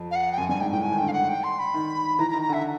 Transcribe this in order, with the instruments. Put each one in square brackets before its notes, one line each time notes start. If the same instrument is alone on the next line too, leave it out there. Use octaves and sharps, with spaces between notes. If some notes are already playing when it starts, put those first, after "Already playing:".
Already playing: [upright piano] F2
[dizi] F5
F#5
G5
[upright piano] F#2 [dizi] G#5
[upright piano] G2 [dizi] G#5
[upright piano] G#2 [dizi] G5
[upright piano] A2 [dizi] G5
[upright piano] D3 [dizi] G#5
[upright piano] D#3
[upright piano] D3 [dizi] G5
[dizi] F5
F#5
G5
C6
B5
[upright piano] D#3
[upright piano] E3 [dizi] A#5
[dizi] A#5
[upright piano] D#3
[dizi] A#5
[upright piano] D3
[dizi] E5